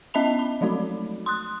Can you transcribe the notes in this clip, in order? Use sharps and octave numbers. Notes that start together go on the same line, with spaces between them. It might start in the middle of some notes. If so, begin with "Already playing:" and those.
B3 C#4 D#5 E5 B5 F7
B5
F3 F#3 A3 D#4 F#4
C6 D#6 F#6